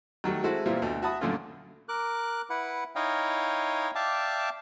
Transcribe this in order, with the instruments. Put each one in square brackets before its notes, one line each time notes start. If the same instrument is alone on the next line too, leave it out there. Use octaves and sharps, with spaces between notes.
[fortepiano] D#3 F#3 G3 A3
G#3 C4 E4 F#4 A4
A#2 E3 G3 C4 E4 F4
D2 B2 A3
F#4 E5 F#5 A5 B5 D#6
F#2 A#2 D3 A3 C#4 F4
[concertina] A#4 D6 F#6
E4 B4 F#5
D#4 E4 C#5 D#5 F5 G5
D5 E5 F5 G5 A5 D6